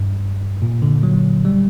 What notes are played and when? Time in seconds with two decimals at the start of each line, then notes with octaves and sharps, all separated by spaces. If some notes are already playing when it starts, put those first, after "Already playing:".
Already playing: G2
0.62 A#2
0.82 D3
1.03 F#3
1.45 G3